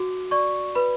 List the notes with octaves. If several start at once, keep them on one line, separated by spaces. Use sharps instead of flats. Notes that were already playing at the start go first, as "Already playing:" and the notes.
Already playing: F#4 D6
D5 C#6
B4 B5